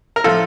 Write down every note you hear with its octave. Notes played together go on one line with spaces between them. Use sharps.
A#4
A2 F3 F4 A4